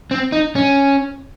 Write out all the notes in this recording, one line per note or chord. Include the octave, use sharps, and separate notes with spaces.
C4
D#4
C#4